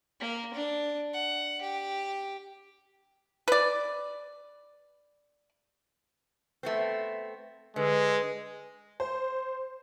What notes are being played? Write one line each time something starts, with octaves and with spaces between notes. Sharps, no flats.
A#3
D4
F#5
G4
B4 D5
A3 B3 C4
D3 G#3 B4
C5